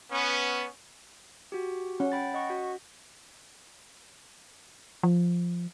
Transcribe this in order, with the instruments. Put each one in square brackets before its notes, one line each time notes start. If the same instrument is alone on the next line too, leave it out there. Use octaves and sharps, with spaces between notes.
[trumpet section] B3 C#4
[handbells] F#4 G4
[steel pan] C#4 [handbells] F#5
[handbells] G5 B5 A6
D#5 F#5 C#6
F#4
[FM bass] F3